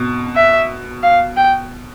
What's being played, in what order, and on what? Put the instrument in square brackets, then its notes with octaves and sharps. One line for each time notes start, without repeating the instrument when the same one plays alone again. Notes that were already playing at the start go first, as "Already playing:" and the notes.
Already playing: [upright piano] B2
[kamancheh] E5
F5
G5